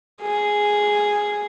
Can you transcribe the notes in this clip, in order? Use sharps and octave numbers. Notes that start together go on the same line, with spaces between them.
G#4